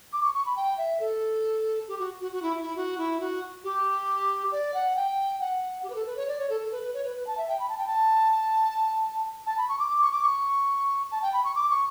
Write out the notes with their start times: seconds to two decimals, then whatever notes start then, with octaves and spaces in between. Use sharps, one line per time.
0.12 D6
0.22 C#6
0.34 C#6
0.45 B5
0.56 G5
0.77 E5
0.99 A4
1.88 G4
1.99 F#4
2.20 F#4
2.32 F#4
2.42 E4
2.61 E4
2.75 F#4
2.97 E4
3.20 F#4
3.64 G4
4.51 D5
4.74 F#5
4.96 G5
5.40 F#5
5.83 G4
5.89 B4
5.94 A4
6.06 B4
6.16 C#5
6.27 D5
6.38 C#5
6.49 A4
6.60 A4
6.71 B4
6.83 B4
6.93 C#5
7.04 B4
7.16 B4
7.26 A5
7.37 E5
7.48 G5
7.59 B5
7.68 A5
7.77 G5
7.87 A5
9.46 A5
9.57 B5
9.68 C#6
9.79 D6
10.01 C#6
10.11 D6
10.22 C#6
11.11 A5
11.22 G5
11.33 B5
11.44 C#6
11.55 D6
11.69 C#6